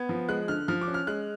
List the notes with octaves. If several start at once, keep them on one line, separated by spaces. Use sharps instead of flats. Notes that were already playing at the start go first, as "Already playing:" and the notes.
Already playing: B3 G#6
F3
G#3 F#6
D3 F6
F3 F6
D6
C#4
F6
G#3 F#6